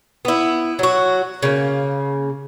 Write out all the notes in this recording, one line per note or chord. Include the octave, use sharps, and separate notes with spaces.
B3 E4
F#3 F#4
C#3 A#3